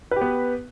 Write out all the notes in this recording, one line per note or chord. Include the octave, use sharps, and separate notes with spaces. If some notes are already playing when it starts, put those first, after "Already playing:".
B3 G4 B4